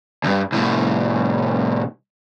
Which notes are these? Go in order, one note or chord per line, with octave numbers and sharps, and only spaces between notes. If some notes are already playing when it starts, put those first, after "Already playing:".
D2 G2
C2 A2